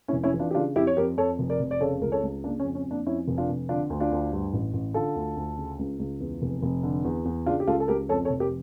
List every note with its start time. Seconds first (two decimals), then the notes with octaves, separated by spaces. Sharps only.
0.08 C#4 E4
0.13 F1
0.23 C#4 E4
0.34 E3
0.40 D4 F4
0.51 G4
0.54 C#3 D4 F4
0.76 F2 E4 G4
0.87 C#5
0.97 F2 G4 A#4
1.17 F2 A4 C#5
1.39 F1
1.50 A#4 D5
1.60 F1
1.71 D5
1.81 C#3 A4 C#5
2.02 C#2 A#4
2.12 A4 C#5
2.23 C#2
2.44 C#3 A#3 D4
2.60 C#4
2.65 F2
2.75 C#4
2.86 F2
2.91 A#3 D4
3.06 F2 C#4 E4
3.28 F1
3.38 D4 F4
3.49 F1
3.69 D3 D4 F4
3.90 D2
4.00 D4 F4
4.12 D2
4.33 G2
4.53 A1
4.74 A1
4.94 D3 F4 A4
5.16 D2
5.37 D2
5.57 C#3
5.79 C#2
5.99 C#2
6.20 E2
6.42 F1
6.62 F1
6.83 D3
7.05 E2
7.25 E2
7.46 C#3 D4 F4
7.60 G4
7.67 C#2 F4 A4
7.80 A4
7.88 C#2 G4 A#4
8.09 F2 A4 C#5
8.25 A4 C#5
8.30 F1
8.40 G4 A#4